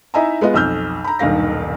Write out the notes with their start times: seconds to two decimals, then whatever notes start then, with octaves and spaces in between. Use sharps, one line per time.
0.14 D#4 E4 D#5 E5 G#5 A#5
0.41 G#3 B3 F4 D#5
0.54 B1 F2 E6 F6 G6
1.04 A#5 B5
1.19 D#1 B1 G2 D#3 F5 A#6